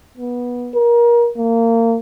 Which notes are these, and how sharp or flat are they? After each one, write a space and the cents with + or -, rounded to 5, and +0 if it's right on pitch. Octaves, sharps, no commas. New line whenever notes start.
B3 -15
A#4 +25
A#3 -25